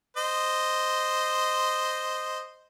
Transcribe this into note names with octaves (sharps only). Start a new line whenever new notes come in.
C5 D#5